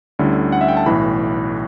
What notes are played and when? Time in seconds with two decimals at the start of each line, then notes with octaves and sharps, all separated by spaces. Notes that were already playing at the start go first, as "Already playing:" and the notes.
0.19 D2 D3 G3 C#4 E4
0.52 F#5
0.61 E5
0.68 G5
0.77 A5
0.86 B1 A2 E3 B5